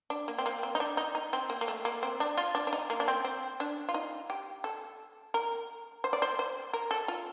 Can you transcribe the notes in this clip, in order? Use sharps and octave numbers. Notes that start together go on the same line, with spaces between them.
D4
A#3
C4
A#3
C4
D#4
D4
D#4
D#4
C4
A#3
A#3
A3
A#3
C4
D4
F4
D4
D4
D#4
A#3
D4
C4
C4
D4
F4
D#4
G4
A4
A#4
C5
D5
C5
C5
A#4
A4
F4